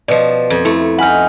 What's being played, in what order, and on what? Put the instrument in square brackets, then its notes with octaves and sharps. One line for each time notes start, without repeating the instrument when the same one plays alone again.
[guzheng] B2 F3 [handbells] D5 D#5
[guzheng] F2
[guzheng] A3 [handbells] E4
[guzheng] D#4 B5 [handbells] F#5 G#5 F6